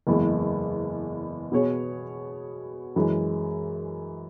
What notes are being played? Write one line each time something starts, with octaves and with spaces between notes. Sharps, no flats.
F#1 E2 E3 G#3
B2 B3 G#4 C#5
F#2 E3 G#3